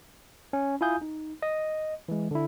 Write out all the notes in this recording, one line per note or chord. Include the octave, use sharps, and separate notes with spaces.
C#4
E4 F4 F5 G#5 D#6 G6
D#4
D#5
E3 G#3
D3 E4